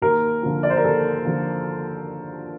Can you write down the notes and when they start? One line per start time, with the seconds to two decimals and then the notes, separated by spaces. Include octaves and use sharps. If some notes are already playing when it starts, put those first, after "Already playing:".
0.02 D#2 A#4
0.43 D3 F3
0.63 D5
0.70 C5
0.77 A#4
0.84 D#2 A4
1.25 D3 F3